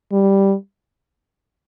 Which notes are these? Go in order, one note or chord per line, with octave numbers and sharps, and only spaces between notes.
G3